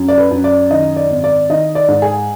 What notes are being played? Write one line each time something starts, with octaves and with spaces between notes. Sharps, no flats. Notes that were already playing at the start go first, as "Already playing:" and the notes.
Already playing: F#2
D5
B4
F#2
D5
D#3 D#5
D5
G#1
D5
D#3 D#5
D5
G#2
G#4